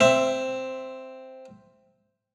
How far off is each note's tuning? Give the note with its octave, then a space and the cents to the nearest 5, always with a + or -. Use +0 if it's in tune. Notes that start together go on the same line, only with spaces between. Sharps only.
C4 +0 E5 +10